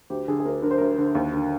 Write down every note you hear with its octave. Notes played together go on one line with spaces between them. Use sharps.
D2 G4
D3 G#4
G#4
D2 A#4
D3 A#4
C5
D2 A#4
D3
D#2
D3